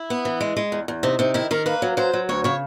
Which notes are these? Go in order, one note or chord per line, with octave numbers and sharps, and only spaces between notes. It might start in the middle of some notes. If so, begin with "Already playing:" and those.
Already playing: E4
B3
E3
G#3
G#3
E2
E2
C3 D#4
C3 D#4
D#3 E4
D#3 A#4
A#3 B4
F#3
F#3 C5
F#3
D2 C#5
C#3 C#5